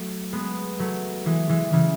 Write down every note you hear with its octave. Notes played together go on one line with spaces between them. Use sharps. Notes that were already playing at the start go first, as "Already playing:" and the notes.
Already playing: F#3 A3
G#3 B3
F#3 A3
E3 G#3
E3 G#3
C#3 E3